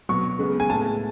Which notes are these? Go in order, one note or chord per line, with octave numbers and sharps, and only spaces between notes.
B2 F#3 B3 C#6
C#3 G#3 B3
G#5
A2 G#3 B3 A5